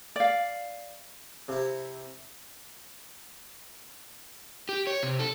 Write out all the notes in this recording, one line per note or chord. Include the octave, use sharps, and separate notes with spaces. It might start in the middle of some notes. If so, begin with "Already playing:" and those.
D5 F5
C3 E4
G4
C#5
C3
A4